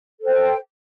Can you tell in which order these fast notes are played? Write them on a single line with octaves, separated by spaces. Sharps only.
A4 C5 G5